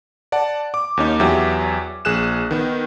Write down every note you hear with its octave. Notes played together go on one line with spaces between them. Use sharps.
D5 F#5 A5
D6
D#2 C#4 D#4
E2 F#3 G4 E5
A#1 G#4 F#6 E7
D#3 B3